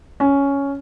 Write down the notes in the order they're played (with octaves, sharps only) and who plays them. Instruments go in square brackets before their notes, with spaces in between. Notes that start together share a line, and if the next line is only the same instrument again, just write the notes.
[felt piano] C#4